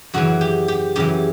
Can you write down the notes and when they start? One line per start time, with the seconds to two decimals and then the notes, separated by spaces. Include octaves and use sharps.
0.14 F#2 C#3 E3 F#4
0.41 G4
0.68 G4
0.96 F#2 C#3 E3 G4